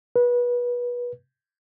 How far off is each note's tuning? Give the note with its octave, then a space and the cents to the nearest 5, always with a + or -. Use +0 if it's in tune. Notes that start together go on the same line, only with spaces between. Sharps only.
B4 -25